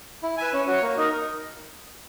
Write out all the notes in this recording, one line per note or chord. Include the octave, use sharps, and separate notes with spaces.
E4
B4 E5 G#5
C#4
F#4 C#5
A#3
D#4 A#4